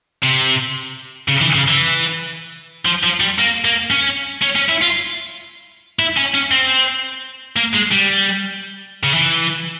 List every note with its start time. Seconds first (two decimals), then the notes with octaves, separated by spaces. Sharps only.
0.24 C3
1.28 C#3
1.41 E3
1.55 C#3
1.68 E3
2.85 F3
3.03 F3
3.20 G3
3.38 A#3
3.65 A#3
3.91 C#4
4.42 C#4
4.56 C#4
4.69 E4
4.82 F4
5.99 E4
6.17 C#4
6.35 C#4
6.52 C4
7.57 A#3
7.74 G#3
7.92 G3
9.04 C#3
9.14 E3